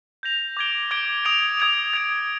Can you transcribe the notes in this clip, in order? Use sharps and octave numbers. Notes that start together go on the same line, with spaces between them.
G6 A#6 F7
D6 G#6 D7 G7
D6 G#6 D7 G7
D#6 G#6 D7 F7
D#6 G#6 D7 F7
G#6 D7 F7